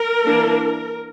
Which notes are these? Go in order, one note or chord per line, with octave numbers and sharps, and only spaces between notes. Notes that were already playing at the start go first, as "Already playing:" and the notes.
Already playing: A#4
E3 A#3 D4